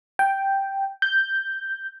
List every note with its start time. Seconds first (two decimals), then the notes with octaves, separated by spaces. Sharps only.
0.19 G5
1.02 G6